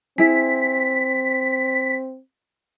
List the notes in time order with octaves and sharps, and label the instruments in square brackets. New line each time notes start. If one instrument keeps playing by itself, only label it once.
[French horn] C4 [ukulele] E4 G#4 [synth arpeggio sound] B6